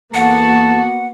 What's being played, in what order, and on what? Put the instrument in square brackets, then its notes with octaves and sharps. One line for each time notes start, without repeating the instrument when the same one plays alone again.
[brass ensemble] E2 A4 A5 [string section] A#3 B3 F#4 [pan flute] F#5